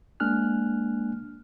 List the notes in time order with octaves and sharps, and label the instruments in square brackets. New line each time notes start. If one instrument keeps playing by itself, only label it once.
[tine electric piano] G#3 A#3 D4 G#5 F6 F#6